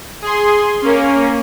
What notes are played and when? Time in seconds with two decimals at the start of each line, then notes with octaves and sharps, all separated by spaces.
0.22 G#4 C6
0.82 A#3 C#4